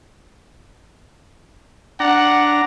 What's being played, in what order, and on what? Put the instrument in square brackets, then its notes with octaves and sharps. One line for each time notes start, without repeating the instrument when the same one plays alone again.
[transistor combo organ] D4 A#5 [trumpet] F#5